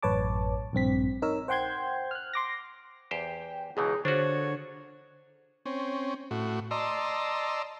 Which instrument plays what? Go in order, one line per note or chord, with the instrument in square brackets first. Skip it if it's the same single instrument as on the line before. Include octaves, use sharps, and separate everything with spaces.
[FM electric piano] A1 F#2 B4 C#5 A5 D6
A#1 G2 C4 B6
D#4 A#4 C#5 E6
C5 F#5 G5 C6 G6 G#6
F6 F#6
C6 D6 A#6
[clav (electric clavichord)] E2 G4 C5 [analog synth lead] G5
[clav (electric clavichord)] C#2 B2 E3 [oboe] D#4 [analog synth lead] G#4
[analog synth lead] D3 [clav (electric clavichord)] D4 F4 F#4 [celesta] C5 [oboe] C#5
[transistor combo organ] C4 C#4
A2 F#4
D5 D#5 A5 A#5 C6 E6